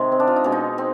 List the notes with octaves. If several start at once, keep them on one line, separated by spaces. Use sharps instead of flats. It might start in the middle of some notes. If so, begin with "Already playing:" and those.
Already playing: C3 D#3 G#3
C4
D4
F4
D#4
B2 G#3 D4
D#4
C4